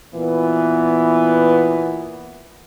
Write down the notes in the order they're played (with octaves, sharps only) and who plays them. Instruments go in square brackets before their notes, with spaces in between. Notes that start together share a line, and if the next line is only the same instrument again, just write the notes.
[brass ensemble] A#2 E3 B3